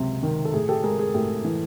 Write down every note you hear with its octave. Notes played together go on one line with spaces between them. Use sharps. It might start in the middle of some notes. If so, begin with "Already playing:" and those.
Already playing: C#2 C3 F#3
D#3
A4
A2 G#4
G4 A4
G#3 G#4 A#4
G#4
A2 G4
E3